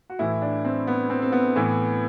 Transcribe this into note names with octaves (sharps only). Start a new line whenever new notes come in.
F#4
A2 E3 E4
D4
C4
B3
C4
C4
B3
A2 E3